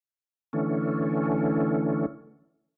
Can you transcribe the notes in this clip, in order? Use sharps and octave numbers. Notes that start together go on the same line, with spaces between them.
D3 E3 A3 C#4